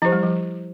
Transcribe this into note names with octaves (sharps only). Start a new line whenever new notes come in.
F3 E4 G4 C5
G3
F3